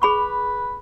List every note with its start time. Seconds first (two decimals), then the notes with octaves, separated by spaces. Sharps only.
0.02 G#4 B4 B5 C#6